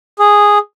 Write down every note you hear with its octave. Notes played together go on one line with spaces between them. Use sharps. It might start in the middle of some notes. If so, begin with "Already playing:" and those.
G#4